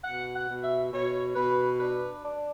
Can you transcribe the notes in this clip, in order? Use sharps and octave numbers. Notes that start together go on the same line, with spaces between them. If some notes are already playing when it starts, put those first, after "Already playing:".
B2 F#5
F#5
B2
E5
B2 C#5
B2 B4
D4 B4
D4